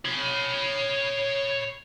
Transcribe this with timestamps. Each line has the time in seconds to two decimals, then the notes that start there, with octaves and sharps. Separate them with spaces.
0.05 C#5 B5